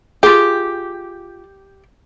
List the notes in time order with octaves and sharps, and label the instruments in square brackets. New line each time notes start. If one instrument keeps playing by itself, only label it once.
[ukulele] F4 G#4 [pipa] G4